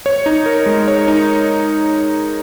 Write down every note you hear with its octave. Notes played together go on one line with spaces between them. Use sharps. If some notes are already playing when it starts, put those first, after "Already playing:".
C#5
D#4
A#4
G#3
C#5
D#4